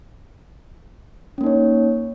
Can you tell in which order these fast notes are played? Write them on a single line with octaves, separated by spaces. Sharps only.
C#4 A#3 D#4 C#5